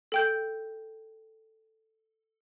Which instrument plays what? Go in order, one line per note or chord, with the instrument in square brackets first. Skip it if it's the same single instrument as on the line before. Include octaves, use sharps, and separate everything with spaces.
[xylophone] A4 G5 G6